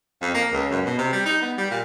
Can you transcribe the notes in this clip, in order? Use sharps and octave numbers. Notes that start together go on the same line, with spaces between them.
F2
A#3
C#2
F#2
B2
C3
G3
D#4
B3
G3
A#2